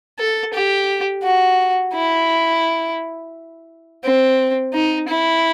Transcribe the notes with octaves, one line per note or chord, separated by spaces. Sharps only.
A4
G4
F#4
E4
C4
D#4
E4